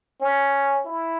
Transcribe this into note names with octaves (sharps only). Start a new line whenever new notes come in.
C#4
E4